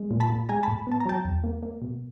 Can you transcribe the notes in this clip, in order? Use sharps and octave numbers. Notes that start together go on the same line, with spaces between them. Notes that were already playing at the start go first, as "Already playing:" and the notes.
Already playing: G#3
A#2
A5 B5
A#2
G#3 G#5 A#5
A5 B5
A2
B3 A5
A#5
F#3 G5 A5
E2
A#3
A#3
B2